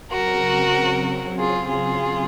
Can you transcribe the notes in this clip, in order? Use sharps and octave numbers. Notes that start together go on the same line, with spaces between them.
C#3 F#3 C4 F#4 A#4
F4 G#4
F4 G#4